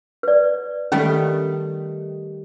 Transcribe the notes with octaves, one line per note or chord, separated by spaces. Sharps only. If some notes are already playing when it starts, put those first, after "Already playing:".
B4 D5
D#3 G3 A3 C#4